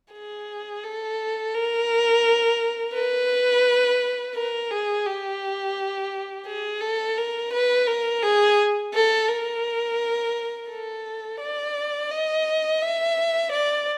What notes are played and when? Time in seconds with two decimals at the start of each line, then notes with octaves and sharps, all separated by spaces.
0.13 G#4
0.84 A4
1.54 A#4
2.95 B4
4.35 A#4
4.71 G#4
5.06 G4
6.46 G#4
6.82 A4
7.17 A#4
7.53 B4
7.87 A#4
8.22 G#4
8.94 A4
9.28 A#4
10.69 A4
11.40 D5
12.10 D#5
12.82 E5
13.52 D5